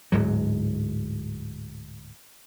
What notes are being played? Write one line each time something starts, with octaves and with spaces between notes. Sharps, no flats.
D1 G#2 F#3